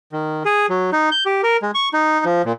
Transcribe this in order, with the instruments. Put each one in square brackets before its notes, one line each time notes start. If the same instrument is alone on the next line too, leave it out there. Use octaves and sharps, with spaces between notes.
[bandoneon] D#3
G#4
F#3
D#4
G6
G4
A#4
G#3
C#6
D#4
F3
A#2